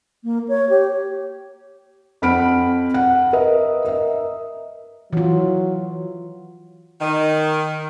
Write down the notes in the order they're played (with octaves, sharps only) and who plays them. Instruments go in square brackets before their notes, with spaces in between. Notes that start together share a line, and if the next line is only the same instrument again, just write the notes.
[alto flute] A#3
C#5
G4
[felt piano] F2 F#5 B5 F6 D7
F#5
A#4 B4 D#5 E5
A#4 D#5 E5
[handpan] E3 F4 [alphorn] F#3
[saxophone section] D#3